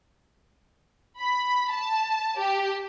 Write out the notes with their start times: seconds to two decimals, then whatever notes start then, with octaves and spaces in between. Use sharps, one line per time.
1.20 B5
1.72 A5
2.37 G4